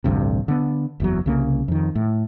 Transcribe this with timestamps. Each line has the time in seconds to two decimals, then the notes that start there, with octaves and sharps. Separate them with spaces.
0.04 A1 D2 G2 C3
0.48 D3 B3
1.00 F#1 E2 F#3
1.26 C2 C#3 A#3
1.68 F2 D#3
1.95 A2